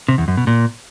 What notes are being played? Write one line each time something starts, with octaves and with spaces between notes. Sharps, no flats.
C3
E2
F#2
B2
A#2